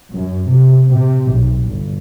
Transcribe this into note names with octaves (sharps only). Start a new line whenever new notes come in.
F#2
C3
C3
B1
G1